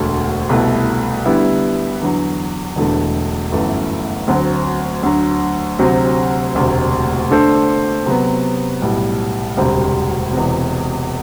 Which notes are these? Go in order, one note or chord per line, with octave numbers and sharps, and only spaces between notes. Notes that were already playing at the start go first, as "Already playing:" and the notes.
Already playing: E1 D2 D3 A3
C2 B2 A3 E4
D3 G3 B3 E4
E2 D3 F#3
E1 E2 D3 A3
G1 F#2 E3 A3
D2 D3 F#3 C4 F#4
D2 D3 F#3
D2 C3 F#3 C4 F#4
E1 D2 C3
D3 A3 D4 A4 C5
C3 F#3 B3
B1 A2 G3
E1 D2 C3 G3 C4
E1 E2 C3